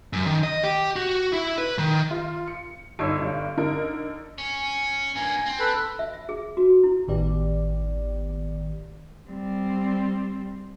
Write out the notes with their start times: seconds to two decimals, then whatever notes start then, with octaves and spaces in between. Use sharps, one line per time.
0.13 F#2
0.26 D#3
0.44 D#5
0.63 G4
0.96 F#4
1.33 E4
1.58 B4
1.78 D#3
2.11 F4
2.47 C#7
2.99 G1 D#4 C#5 E6
3.20 G1 G2
3.57 D3 D#4 A#4
4.38 C#4
5.16 G2 A#3 G#5
5.46 C4
5.59 A4 B4
5.99 E5
6.14 E5
6.29 G#4
6.57 F#4
6.84 E4
7.08 G#1 A2 D#3 B3 G4 D5
9.30 G3 C4